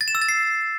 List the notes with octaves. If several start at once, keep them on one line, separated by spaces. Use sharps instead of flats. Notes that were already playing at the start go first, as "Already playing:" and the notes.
A6
E7
E6
A6
C7